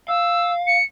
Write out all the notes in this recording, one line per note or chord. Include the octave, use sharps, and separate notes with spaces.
F5 E6
C#7